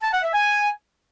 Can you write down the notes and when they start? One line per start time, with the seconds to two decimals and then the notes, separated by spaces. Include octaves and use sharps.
0.02 A5
0.12 F#5
0.22 E5
0.33 G#5